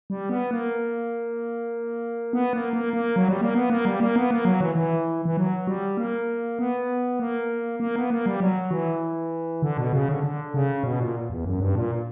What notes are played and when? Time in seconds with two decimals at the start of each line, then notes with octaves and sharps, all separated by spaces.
0.10 G3
0.29 B3
0.51 A#3
2.33 B3
2.53 A#3
2.73 A#3
2.93 A#3
3.16 F#3
3.28 G3
3.41 A#3
3.55 B3
3.70 A#3
3.85 G3
4.00 A#3
4.16 B3
4.31 A#3
4.45 F#3
4.60 E3
4.75 E3
5.25 E3
5.37 F#3
5.67 G3
5.97 A#3
6.59 B3
7.20 A#3
7.80 A#3
7.96 B3
8.10 A#3
8.26 G3
8.40 F#3
8.71 E3
9.62 D3
9.77 B2
9.93 C#3
10.09 D3
10.24 D3
10.54 C#3
10.84 B2
11.00 A#2
11.30 E2
11.45 F#2
11.60 G2
11.75 A#2